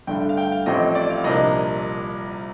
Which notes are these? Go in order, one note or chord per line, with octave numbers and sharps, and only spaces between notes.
G2 D3 A3 G5
F5
G5
F5
A1 A2 F3 C4 D#5
D5
F5
C2 A#2 F3 A#3 D4 D#5